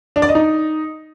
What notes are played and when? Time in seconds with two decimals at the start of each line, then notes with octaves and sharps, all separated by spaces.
0.16 D4
0.22 D5
0.29 D#5
0.35 D#4